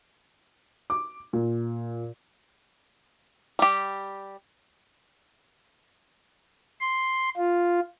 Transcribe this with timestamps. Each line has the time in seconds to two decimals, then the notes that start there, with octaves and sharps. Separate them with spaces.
0.90 D6
1.33 A#2
3.59 G3 G4
6.81 C6
7.37 F4